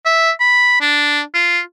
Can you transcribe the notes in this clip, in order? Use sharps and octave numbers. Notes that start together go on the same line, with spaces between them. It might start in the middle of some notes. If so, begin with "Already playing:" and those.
E5
B5
D4
F4